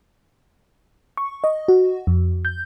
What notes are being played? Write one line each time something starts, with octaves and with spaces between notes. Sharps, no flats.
C#6
D#5
F#4
F2
G6